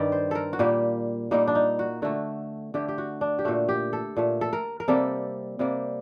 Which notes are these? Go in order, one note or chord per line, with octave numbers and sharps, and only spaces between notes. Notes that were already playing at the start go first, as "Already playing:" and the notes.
Already playing: G2 D#3 G3 D5
C5
A4 A#4
F#4
A#2 G3 A#3 G4
A#2 G3 A#3 D#4
D4
D#4
F#4
D3 A3 F#4
D3 A3 G4
G4
F#4
D4
G4
A#2 A3 F#4
G4
A4
A#2 A3
A4
A#4
A#4
C3 G3 A#3 A4
C3 G3 A#3